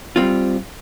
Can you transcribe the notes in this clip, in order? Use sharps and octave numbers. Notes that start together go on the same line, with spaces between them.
G3 C4 F4